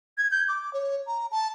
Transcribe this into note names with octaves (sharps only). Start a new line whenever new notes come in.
G#6
G6
D6
C#5
A#5
A5